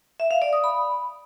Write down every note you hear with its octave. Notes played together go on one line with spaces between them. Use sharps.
E5
F5
D5
D#6
B5